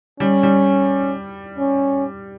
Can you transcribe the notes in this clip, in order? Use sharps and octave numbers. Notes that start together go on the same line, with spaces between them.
G3 C#4
G3
C#4